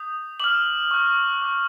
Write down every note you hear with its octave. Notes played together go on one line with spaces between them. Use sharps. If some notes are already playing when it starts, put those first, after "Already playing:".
Already playing: D#6 G6
D6 F6 F#7
C#6 F#6
D6 F#6